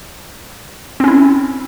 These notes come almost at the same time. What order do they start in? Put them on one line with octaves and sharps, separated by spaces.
C4 C#4 E4